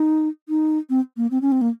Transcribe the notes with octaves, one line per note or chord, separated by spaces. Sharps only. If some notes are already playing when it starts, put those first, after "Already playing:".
Already playing: D#4
D#4
C4
A#3
C4
C#4
C4
A#3